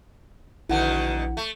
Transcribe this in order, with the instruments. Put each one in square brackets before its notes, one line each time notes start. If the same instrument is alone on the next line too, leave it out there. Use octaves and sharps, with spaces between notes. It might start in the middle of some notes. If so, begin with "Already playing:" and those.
[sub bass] A#1 [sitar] B2 D3 D#3 [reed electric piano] E4 F#5
[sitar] A3